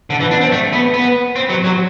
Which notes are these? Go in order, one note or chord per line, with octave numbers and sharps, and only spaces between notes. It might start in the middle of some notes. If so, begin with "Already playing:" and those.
D3
E3
D4
C4
A3
B3
B3
C4
F#3
F#3